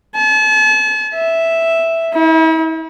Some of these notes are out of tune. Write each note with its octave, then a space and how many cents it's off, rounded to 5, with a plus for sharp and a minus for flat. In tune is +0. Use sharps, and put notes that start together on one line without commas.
A5 -40
E5 +0
E4 -40